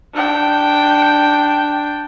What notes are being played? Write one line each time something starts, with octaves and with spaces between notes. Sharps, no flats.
D4 G5